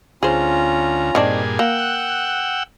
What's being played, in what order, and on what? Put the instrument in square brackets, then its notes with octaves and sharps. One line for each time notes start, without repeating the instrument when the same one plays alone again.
[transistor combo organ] D2 [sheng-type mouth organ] C#4 F4 A#5 [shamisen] G#4 C5
[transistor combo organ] G2 A#2 G#4 [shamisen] D#3 C4 D4
[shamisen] A#3 [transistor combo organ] F#5 G5 E6
[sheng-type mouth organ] F#6